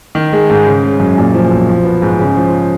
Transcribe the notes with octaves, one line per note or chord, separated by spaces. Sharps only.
D#3
G#3
G#2
C#3
G#3
F#2
A#2
F3
B1
F3
B3
G#2
C#3
F3